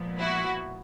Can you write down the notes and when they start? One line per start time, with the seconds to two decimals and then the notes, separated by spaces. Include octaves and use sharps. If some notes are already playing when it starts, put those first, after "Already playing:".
Already playing: A#2 F3 G#3 B3
0.19 E4 F#4